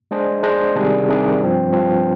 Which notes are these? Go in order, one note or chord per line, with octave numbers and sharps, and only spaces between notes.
G#3 D4 G#4 C5 D#5
G#3 D4 G#4 C5 D#5
C3 D#3 G3 D4 G#4
C3 D#3 G3 D4 G#4
G2 F3 C4
G2 F3 C4